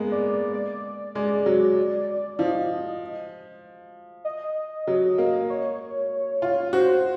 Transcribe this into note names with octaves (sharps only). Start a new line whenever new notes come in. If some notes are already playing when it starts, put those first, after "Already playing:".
Already playing: G#3 A#3 B3
D5
D5
D5
G#3 D5
F#3
F3 D#5
D#5
F#3
A#3
C#5
F4
F#4 C5